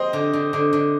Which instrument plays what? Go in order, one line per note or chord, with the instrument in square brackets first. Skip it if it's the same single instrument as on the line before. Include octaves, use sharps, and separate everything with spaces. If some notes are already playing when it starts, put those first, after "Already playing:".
Already playing: [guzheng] C4 [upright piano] C5 D#5
[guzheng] D3
D3
D3
D3